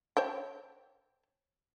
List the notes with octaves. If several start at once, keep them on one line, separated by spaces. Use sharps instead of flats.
C5 C#5 G5